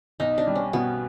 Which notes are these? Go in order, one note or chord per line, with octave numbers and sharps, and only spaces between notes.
B1 D#4
D4
G3
C#4
B2 B3